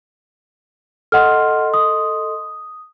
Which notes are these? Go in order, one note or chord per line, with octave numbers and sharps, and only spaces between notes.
A4 D#5 F#5 C6 F6
D#6